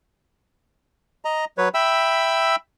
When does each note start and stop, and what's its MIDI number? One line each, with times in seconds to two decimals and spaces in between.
1.25 1.45 75
1.25 1.45 82
1.58 1.69 54
1.58 1.69 71
1.58 1.69 73
1.74 2.56 76
1.74 2.56 79
1.74 2.56 83
1.74 2.56 88